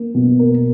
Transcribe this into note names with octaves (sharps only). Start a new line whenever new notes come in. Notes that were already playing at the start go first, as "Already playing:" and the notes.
Already playing: A#3
B2
A#4